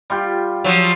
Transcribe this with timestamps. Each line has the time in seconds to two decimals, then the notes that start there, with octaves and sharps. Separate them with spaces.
0.10 G3 F4 G5
0.64 F3 F#3